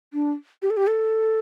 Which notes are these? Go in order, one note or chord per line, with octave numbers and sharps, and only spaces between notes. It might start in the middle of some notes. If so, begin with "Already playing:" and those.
D4
G4
A4
G4
A4